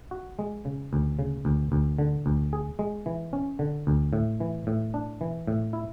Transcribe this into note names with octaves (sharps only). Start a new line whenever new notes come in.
F#4
G#3
C#3
D2
C#3
D2
D2
D3
D2
G#4
G#3
E3
C#4
D3
D2
A2
E3
A2
D4
E3
A2
E4